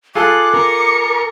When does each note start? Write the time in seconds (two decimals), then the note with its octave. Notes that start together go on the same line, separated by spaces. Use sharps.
0.15 F4 G#4 A4 D6 F#6
0.54 A#4 A#5 C#7